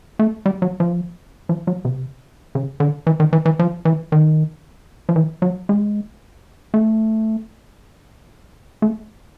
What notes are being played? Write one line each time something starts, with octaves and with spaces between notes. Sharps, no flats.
A3
G3
F#3
F3
F3
F#3
C3
C#3
D3
E3
D#3
E3
E3
F3
E3
D#3
F3
E3
F#3
G#3
A3
A3